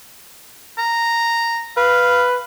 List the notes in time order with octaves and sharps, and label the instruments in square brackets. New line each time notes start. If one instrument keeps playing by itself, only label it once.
[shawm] A#5
[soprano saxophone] B4 [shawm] F5